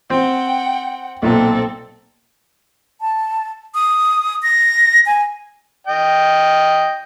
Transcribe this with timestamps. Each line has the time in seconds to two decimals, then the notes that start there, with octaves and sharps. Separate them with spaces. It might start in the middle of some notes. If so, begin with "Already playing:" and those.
0.10 C4 F#5 G5
1.22 B1 A#2 C4 A4
3.01 A5
3.75 D#6
4.43 A#6
5.06 G#5
5.87 D#5 G5